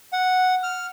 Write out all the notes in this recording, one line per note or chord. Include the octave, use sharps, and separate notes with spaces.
F#5
F6